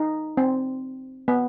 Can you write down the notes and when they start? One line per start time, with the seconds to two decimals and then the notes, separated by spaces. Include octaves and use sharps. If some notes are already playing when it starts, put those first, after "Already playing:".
Already playing: D#4
0.37 C4
1.28 B3